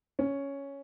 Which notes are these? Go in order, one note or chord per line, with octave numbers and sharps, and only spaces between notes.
C#4